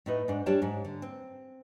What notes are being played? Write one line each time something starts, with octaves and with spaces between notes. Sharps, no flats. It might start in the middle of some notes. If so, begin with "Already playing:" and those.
A2 D#4 B4 D#5
G#2 D4
G3 D4 G4 C#5 A5
G#2
D3
C4